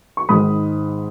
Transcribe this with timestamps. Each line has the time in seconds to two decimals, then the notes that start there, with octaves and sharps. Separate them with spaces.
0.17 C#6
0.29 G#1 G#2 D#3 B5 D#6